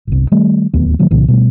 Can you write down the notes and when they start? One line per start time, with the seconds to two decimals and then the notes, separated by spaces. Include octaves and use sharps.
0.07 G1 C2
0.32 D#3 G3 A3
0.74 D1 D#2 A3 B3
0.99 A#2 D#3 F#3 A#3
1.11 C2 A#2 C#3 E3
1.28 B2 G3 A3